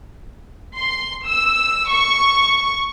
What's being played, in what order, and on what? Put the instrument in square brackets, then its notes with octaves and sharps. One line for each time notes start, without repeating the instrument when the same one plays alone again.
[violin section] C6
E6
C#6